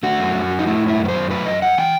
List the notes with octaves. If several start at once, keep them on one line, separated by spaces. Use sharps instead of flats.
A3 F#4
F#2
F#2
F#3
D#4
A3 E4
F#2
E4
F#2
B4
C5
F#3
A3 B4
F#2 D#5
F#2 F#5
E3 G5